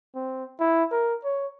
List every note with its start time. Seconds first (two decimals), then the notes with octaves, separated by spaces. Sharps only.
0.15 C4
0.60 E4
0.91 A#4
1.24 C#5